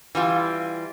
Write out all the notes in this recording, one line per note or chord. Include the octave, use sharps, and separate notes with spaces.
E3 G3 F4